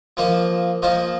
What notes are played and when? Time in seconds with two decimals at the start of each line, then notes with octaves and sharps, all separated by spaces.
0.17 F3 A#3 F4 C5 D#5
0.82 F3 A#3 F4 C5 D#5